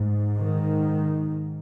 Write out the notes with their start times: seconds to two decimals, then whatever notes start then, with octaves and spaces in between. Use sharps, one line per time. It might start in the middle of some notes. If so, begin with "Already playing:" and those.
Already playing: G#2
0.40 D#3